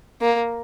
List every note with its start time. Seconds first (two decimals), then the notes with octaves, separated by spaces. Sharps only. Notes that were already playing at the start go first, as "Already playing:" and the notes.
0.21 A#3